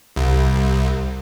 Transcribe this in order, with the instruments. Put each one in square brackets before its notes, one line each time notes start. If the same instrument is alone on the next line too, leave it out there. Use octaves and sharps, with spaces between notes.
[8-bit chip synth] C2